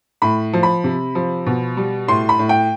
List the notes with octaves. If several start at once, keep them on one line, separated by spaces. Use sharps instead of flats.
A2 B5
F3
B5
C3
F3
B2
G3
A2 C6
B5
A2
G5